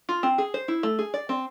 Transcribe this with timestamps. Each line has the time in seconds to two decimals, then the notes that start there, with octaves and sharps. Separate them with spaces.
0.09 F4
0.23 C4
0.38 G#4
0.54 C5
0.68 E4
0.83 A3
0.99 G#4
1.14 D5
1.29 C4